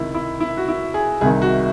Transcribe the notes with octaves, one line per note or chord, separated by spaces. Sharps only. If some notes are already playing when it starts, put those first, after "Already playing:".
Already playing: C#2 C3 D#3 E4
E4
E4
F#4
E4
G#4
C2 C3 D#3 G#4
F#4